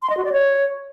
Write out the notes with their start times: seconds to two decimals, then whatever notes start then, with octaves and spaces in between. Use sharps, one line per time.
0.02 C6
0.10 D#5
0.17 F#4
0.25 D5
0.32 C#5